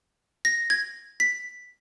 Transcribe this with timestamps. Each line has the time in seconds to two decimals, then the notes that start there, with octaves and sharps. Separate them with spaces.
0.45 A#6
0.70 G#6
1.20 B6